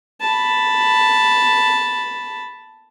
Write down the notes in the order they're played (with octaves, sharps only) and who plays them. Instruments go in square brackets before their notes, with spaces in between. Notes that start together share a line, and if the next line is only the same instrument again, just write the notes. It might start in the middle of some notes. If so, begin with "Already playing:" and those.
[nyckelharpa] A5 B5